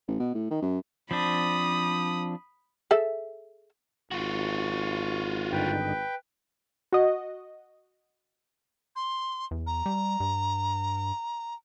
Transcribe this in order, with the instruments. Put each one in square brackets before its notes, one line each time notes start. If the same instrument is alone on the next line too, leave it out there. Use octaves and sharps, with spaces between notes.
[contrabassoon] A1
B2
A2
D#3
F#2
[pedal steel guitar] F3 C4 D4 [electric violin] B5 D#6
[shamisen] G#4 A4 E5
[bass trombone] G#1 [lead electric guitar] F4 F#4 [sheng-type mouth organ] C#6
[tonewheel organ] G2 D3 D#4 [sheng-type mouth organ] B4 G5
[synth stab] F#4 D#5
[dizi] C6
[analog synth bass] E2
[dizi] A#5
[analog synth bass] G3
G2